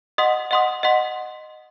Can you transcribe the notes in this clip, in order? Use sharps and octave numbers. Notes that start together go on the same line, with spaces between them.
D#5 F#5 C6 D#6
D#5 F#5 C6 D#6
D#5 F#5 C6